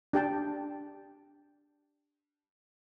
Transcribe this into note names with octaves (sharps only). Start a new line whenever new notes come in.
D4 G4 G5 A5